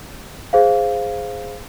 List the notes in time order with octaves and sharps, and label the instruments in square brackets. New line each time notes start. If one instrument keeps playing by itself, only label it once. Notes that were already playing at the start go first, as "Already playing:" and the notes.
[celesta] G#4 C5 F5